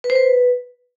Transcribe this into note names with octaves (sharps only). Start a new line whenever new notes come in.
B4
C5
B4